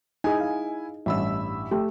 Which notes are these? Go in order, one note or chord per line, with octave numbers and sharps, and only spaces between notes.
D#4 E4 G#4 G#5
F5
A1 G2 E5 B5 E6
A3 G4